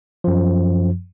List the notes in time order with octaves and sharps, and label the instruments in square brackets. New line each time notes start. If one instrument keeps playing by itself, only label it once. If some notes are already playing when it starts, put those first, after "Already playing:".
[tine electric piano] F#2 F3